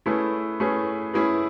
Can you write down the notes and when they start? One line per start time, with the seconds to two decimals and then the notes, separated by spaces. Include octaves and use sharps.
0.06 A3 C#4 E4 G#4 B4
0.60 A3 C#4 E4 G#4 B4
1.13 A3 C#4 E4 G#4 B4